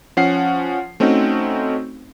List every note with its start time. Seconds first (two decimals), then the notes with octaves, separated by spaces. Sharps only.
0.17 F3 C#4 F#5 C7
1.00 A3 C4 C#4 D#4 F#4